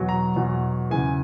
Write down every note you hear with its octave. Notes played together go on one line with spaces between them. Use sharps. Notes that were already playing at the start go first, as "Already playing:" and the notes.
Already playing: E2 B2 F#3
A#5
E2 B2 F#3
E2 C#3 E3 G#5